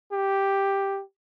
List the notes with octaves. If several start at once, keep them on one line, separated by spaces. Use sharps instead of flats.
G4